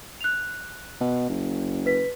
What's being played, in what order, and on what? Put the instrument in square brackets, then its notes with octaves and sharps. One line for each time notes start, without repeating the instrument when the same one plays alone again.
[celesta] F#6 F7
[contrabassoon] B2
F#1
[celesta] B4 B6